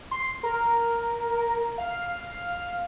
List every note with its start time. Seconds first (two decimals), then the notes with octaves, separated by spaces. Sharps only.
0.11 C6
0.43 A#4
1.78 F5